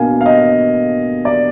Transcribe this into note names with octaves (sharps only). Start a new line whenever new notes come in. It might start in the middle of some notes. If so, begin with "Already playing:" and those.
Already playing: B2 A#3 D4 F5 G#5
F5
D#5
D5